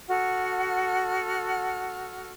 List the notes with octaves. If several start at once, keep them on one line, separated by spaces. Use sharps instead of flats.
F#4 A4 F#5 F6